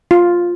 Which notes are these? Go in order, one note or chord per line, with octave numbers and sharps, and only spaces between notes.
F4